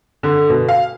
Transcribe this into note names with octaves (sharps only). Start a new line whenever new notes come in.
D3
B2
F5